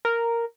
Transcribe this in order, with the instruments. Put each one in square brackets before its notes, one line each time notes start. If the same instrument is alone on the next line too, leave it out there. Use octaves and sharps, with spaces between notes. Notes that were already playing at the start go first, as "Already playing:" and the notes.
[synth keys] A#4